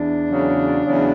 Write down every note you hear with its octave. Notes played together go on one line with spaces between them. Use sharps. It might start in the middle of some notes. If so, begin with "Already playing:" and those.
Already playing: E2 D4
E2 C#3 F#3
E2 C#3 F#3